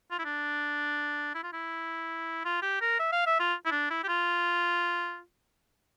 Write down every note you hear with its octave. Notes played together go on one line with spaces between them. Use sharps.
F4
E4
D4
E4
F4
E4
F4
G4
A#4
E5
F5
E5
F4
E4
D4
E4
G4
F4